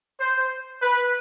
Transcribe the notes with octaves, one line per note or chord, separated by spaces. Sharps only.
C5
B4